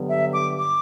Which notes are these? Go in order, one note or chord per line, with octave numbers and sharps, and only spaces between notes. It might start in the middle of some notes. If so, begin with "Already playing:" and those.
Already playing: G2 D3 F#3 B3
E5
D6
D6